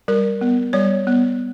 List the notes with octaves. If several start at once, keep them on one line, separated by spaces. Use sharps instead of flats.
G3 A#4
B3
G3 C#5
B3